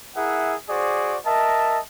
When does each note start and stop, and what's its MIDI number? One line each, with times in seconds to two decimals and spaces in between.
0.16 0.55 64
0.16 0.55 68
0.16 0.55 70
0.16 0.55 76
0.16 0.55 78
0.69 1.17 66
0.69 1.17 68
0.69 1.17 72
0.69 1.17 74
1.26 1.80 70
1.26 1.80 75
1.26 1.80 76
1.26 1.80 81